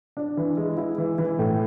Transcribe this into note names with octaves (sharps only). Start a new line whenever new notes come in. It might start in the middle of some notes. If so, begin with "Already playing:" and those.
D4
E3
G#3
E4
E3
E3
A2